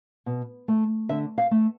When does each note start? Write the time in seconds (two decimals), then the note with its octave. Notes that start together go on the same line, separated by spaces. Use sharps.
0.26 B2
0.68 A3
1.09 D3 E5
1.38 F5
1.51 A3